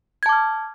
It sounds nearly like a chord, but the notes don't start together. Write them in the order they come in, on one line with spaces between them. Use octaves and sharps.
G#6 A5 D6 F6